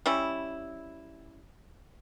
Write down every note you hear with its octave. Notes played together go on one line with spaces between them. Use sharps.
G3 C#4 E4